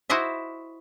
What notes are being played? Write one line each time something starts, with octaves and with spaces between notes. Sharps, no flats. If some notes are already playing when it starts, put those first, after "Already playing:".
E4 F#4 C5 D#5 E5